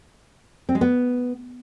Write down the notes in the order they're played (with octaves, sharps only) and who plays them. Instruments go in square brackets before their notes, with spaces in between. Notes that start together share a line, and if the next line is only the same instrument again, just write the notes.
[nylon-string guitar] C4
G#3
B3